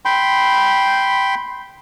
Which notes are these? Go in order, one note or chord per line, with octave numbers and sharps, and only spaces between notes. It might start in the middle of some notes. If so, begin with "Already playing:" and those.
G5 B5 C6